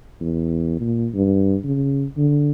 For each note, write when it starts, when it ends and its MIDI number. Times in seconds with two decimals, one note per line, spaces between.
0.21 0.79 40
0.80 1.09 46
1.14 1.56 43
1.64 2.06 49
2.17 2.52 50